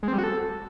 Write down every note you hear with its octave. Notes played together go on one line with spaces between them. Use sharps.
G#3
C4
G3
F#4
A4